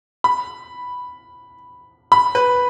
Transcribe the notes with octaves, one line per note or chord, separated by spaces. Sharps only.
B5
B5
B4